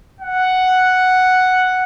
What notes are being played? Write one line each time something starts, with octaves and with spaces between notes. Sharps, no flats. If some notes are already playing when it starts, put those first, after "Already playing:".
F#5